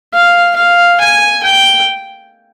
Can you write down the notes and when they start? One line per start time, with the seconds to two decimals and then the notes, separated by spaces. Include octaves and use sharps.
0.14 F5
0.56 F5
1.00 G#5
1.43 G5